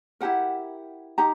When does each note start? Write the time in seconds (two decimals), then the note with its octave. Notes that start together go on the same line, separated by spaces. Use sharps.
0.21 E4 G4 A#4 F#5
1.18 D#4 G4 A#5